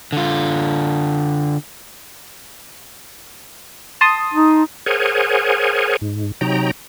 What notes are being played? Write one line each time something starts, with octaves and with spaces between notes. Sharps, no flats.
D3 F4
A5 C6 D#6
D#4
G#4 A#4 C5 C#5 F#5 G#5
G#2
C3 F#3 D#4 G5 A#5